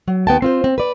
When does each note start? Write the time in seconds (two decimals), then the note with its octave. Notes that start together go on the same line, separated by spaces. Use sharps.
0.08 F#3
0.27 D#2 B3 G5 A5
0.42 C4 F4 C5
0.64 C4
0.78 B4 D5